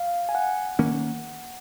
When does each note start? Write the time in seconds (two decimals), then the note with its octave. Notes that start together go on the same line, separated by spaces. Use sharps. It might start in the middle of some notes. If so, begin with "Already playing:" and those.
Already playing: F5
0.29 G#5
0.35 F#5
0.79 D#3 A#3 C#4